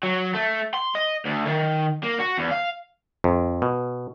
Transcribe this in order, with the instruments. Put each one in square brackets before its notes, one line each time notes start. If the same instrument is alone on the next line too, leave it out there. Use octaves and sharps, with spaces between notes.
[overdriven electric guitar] F#3
A3
C6
D#5
D2
D#3
A#3
F#4
E2
F5
[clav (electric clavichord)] F2
B2